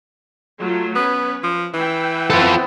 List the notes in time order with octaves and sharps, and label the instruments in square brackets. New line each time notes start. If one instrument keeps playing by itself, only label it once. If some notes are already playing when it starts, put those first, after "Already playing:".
[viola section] F#3 A3 F4
[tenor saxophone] B3 [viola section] C#4 B4
[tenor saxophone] F3
[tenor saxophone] E3 [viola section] B4 E5 G5
[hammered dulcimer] B3 C4 E4 [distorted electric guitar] F4 A4